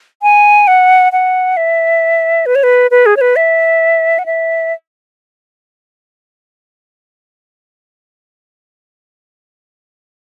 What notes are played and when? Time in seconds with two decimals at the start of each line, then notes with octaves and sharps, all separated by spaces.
0.22 G#5
0.67 F#5
1.12 F#5
1.57 E5
2.46 B4
2.55 C#5
2.63 B4
2.91 B4
3.06 G#4
3.17 C#5
3.21 B4
3.36 E5
4.19 F#5
4.26 E5